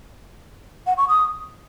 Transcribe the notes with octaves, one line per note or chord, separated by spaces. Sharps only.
F#5
C#6
D#6